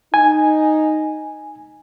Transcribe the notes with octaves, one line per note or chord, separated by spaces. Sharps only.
D#4 G#5